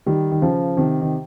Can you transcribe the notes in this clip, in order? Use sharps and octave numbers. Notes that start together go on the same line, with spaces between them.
D#3 G3
D#3
C#3 F3
C3 D#3
D#3